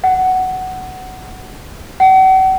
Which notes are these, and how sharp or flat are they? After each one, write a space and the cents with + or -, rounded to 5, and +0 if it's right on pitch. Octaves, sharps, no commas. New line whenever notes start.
F#5 +10
F#5 +40